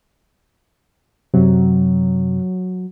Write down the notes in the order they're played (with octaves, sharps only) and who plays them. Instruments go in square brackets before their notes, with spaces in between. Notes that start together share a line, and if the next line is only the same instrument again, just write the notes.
[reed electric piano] F#2 C3 [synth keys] F#3